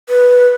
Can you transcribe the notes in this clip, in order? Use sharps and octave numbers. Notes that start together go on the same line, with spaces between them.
B4